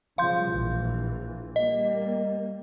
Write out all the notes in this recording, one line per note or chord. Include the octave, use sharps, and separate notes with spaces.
C#3 F3 G3 F5 C6 G6
A#1 E3
G3 A#3 D#5